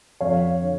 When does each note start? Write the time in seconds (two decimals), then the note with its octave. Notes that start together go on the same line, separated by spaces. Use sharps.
0.21 F2 C#5 F5
0.61 D3